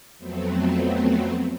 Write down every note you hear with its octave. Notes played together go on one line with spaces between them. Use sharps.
F2 F#3 A3 B3 C4